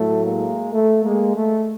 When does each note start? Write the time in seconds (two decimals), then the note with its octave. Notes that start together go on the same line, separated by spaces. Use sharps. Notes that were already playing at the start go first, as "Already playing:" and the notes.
Already playing: A2 F#3 A3
0.26 G#3 A#3
0.73 A3
1.03 G#3 A#3
1.35 A3